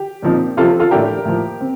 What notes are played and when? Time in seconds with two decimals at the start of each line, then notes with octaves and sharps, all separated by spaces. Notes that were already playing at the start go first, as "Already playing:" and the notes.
Already playing: G4
0.22 A#2 F3 C4 D#4
0.57 C3 F3 C4 F4 A4
0.79 F4 A4
0.91 A2 A3 D4 G4 A#4
1.25 A2 F3 A#3
1.61 C4